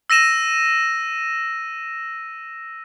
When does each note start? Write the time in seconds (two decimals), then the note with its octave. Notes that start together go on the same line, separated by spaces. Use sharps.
0.10 E6 A#6 D#7 E7